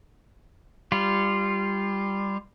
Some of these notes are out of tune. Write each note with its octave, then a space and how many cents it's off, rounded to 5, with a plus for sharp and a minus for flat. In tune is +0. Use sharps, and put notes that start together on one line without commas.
G3 +10 F4 -10